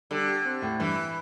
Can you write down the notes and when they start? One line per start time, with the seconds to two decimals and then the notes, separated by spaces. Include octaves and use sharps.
0.11 D3 G3
0.27 G4
0.45 C4
0.62 A2
0.79 G2 E3